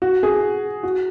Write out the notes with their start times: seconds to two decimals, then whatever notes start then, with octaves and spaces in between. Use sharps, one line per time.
0.02 F#4
0.23 G#4
0.83 F#4